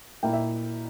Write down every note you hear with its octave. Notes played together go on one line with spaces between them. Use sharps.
A#2 A#3 E4 G5
E5